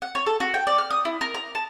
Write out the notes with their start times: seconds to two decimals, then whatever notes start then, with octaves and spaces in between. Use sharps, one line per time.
0.02 F#5
0.15 C#5
0.26 A4
0.40 F#4
0.54 G5
0.67 D5
0.78 F6
0.91 D#6
1.05 E4
1.21 A#4
1.34 A#5
1.55 A5